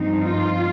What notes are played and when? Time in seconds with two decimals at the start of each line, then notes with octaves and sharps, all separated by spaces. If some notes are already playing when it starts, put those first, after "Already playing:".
Already playing: G2 F3 C4 D#4
0.21 F4